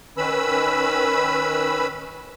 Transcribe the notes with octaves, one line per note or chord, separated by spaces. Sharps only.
D#3 C#4 B4 B5 E6